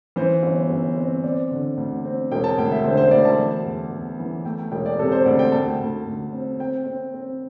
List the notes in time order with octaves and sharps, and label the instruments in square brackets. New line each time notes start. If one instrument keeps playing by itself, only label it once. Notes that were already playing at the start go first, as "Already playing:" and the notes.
[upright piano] E3 C5
G1
G1
C4
C4 D5
D3
D2
C4
E1 G5
A5
D2 G5
E5
D3 C5
C5
D2 D5
A5
E3
E2
E2
E3
A3 G5
G5
E1 G5
D5
C3 A4
C5
D2 D5
G5
D2 A5
D2
D2
C4
C4 G5
C4
C4